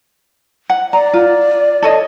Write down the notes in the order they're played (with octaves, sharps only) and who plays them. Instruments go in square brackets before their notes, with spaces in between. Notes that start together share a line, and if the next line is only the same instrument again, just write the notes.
[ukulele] F#5
[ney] D5 [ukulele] A#5
[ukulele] F4
A4 C#5 D#5